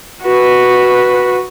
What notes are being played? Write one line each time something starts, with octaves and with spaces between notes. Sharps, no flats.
F#4 B4